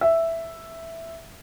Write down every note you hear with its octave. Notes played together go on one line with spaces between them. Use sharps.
E5